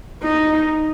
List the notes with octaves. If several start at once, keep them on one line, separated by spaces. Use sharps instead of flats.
D#4